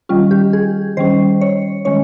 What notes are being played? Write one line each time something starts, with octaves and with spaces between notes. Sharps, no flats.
D#3 G3 C#4 F4
G4
G#4
D#3 G3 C#4 C5
C#5
D#3 G#3 C#4 C#5